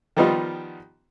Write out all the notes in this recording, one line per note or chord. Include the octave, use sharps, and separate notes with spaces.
D#3 F3 G3 B3 D#4 F4